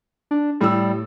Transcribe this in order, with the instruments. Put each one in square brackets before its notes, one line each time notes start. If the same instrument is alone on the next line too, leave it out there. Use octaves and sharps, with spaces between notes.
[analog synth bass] D4
[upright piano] A2 E6 [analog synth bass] G3